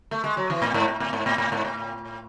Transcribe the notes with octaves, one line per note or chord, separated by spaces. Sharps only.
A3
G#3
F#3
E3
A2
G#2
A2
A2
G#2
A2
A2
G#2
A2